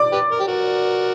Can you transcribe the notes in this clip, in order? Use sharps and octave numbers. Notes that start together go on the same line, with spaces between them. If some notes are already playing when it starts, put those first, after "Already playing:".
Already playing: D5 D6
G4 B4
A#4
G4
F#4 A#4